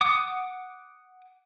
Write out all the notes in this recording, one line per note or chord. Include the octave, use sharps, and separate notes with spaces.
F#5 D6 D#6